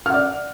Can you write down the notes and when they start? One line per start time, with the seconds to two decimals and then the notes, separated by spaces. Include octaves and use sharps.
0.06 F6
0.10 F#5
0.14 D5